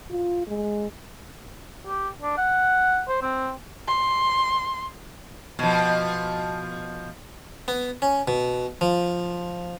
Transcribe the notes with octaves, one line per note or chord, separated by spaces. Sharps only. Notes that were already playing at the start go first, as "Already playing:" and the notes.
F4
G#3
G4
D4
F#5
C5
C4
C6
B2 F3
B3
C#4
B2
F3